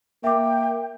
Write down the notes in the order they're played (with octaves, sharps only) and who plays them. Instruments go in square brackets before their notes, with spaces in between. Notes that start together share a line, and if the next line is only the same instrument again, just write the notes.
[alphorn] A#3 [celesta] E5 D6 [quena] G5